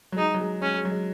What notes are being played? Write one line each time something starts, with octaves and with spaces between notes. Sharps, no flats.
F#3
G#3 D#4
F#3
G#3
G#3 C#4
G#3
F#3
G#3